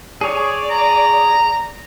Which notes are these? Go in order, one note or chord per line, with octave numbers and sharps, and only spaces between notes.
G#4 C#5 D5
A#5